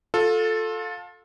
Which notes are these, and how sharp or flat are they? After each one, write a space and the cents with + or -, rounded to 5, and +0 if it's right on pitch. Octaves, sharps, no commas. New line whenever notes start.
F4 +30 A4 +0